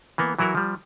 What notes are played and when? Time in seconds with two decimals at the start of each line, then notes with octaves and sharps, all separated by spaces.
0.18 E3 A#3 B3
0.39 E3 F#3 E4 F#4 A#4
0.55 F3 G3